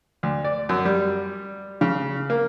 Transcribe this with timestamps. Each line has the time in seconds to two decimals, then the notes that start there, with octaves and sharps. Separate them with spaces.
0.23 D2
0.44 D5
0.69 F#2
0.85 G3
1.81 C#3
2.30 A#3